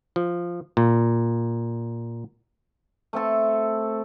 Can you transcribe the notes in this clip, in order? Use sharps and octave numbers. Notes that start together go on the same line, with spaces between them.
F3
A#2
A3 C4 A4